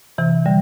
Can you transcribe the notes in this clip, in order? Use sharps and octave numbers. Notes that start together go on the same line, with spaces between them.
C3 E3
D3 G3